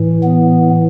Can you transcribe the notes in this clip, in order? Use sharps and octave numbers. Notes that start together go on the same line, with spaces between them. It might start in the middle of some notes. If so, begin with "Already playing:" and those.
Already playing: A2 E3
B3